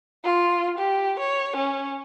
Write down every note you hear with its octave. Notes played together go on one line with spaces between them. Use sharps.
F4
G4
C#5
C#4